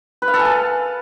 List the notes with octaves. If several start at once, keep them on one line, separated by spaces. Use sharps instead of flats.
B4
F5
A4
G#5
A5